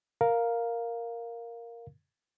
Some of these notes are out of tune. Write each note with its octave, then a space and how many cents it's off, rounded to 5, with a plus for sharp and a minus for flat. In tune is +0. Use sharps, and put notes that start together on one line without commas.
A#4 +0 F5 +0